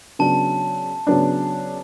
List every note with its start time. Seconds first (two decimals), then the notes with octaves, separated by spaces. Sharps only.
0.19 C#3 F#3 B3 D4 A5
1.07 C#3 F#3 B3 D4